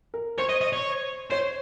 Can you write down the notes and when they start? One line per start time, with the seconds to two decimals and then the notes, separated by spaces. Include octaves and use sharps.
0.14 A#4
0.38 C5 C#5
0.49 D#5
0.61 D#5
0.73 C#5
1.31 C5 C#5